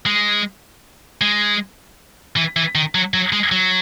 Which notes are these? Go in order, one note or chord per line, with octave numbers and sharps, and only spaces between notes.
G#3
G#3
E3
E3
D#3
F#3
F#3
G#3
F#3